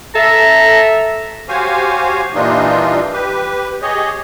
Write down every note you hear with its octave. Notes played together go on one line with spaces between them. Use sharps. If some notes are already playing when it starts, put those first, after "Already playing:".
A4 E5 A#5
F#4 G4 C5 C#5 F5 G#5
A#2 E3 G3 D4 D#4 F4
G4 B4
G4 G#4 C#5 D#5